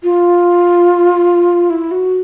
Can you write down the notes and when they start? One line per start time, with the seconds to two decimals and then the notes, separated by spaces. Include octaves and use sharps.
0.03 F4
1.70 E4
1.91 F#4